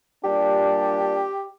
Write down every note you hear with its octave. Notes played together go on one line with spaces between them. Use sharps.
A#2 G3 D4 G4